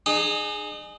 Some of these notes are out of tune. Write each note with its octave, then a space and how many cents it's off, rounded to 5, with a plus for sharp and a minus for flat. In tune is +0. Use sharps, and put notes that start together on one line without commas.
D#4 -40 G#4 +5